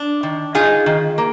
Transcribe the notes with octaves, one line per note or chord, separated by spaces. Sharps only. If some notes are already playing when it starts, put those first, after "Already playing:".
Already playing: D4
D#3
D#4 F4 G#4
D#3
A#3